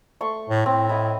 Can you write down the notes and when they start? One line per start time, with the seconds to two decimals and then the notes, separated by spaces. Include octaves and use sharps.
0.21 A3 C6 C#6
0.50 A2
0.66 A2 C4
0.89 E4 D#5 F#5